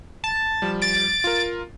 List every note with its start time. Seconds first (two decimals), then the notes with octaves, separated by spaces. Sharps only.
0.24 A5
0.62 F3 G3
0.82 A6 D7
1.24 F4 A#4